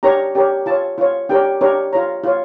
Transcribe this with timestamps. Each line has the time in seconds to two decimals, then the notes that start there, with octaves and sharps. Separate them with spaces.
0.03 D4 G4 A#4 C#5 A#5
0.35 D4 G4 A#4 C#5
0.66 F4 C#5 A5
0.98 F4 C#5
1.29 D4 G4 A#4 C#5 G5
1.61 D4 G4 A#4 C#5
1.93 F4 C#5 A#5
2.24 F4 C#5